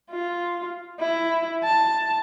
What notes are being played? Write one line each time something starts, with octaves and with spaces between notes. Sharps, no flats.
F4
E4
A5